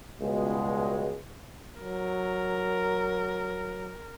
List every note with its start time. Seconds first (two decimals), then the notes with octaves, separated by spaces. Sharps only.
0.21 C#2 B2 G3 G#3
1.81 F#3 A#4